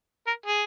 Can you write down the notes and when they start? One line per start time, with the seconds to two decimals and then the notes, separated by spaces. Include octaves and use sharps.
0.27 A#4
0.46 G#4